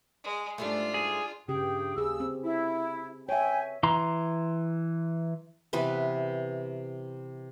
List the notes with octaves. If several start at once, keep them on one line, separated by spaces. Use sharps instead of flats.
G#3
G#2 G3 A3 D4 F4
G#4
G2 C#3 G4 G#4 G5
D#2 C#3 G4 G#4 E6
C4
E4
C#5 E5 G5 G#5
E3 A#5 C6
C3 E3 B3 B4